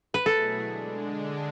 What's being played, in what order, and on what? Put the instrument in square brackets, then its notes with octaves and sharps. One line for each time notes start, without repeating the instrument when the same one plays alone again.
[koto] B4
[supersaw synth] B2 F#3 A3 E4 G#4 [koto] A4
[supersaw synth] D3 G#3 D4